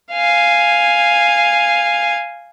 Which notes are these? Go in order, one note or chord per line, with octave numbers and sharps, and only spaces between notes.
F5 G#5